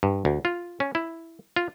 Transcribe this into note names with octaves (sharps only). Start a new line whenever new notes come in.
G2
D2
F4
C#4
E4
F4